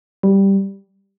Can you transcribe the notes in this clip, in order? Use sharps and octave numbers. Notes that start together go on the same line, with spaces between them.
G3